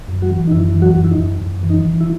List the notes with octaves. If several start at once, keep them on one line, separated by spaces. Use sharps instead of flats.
F#2
F#3 F#4
E3
D#4
F#2 E4
E3
F#3 F#4
F#2
E4
D#4
F#2
F#2
E3
D#4
E3
E4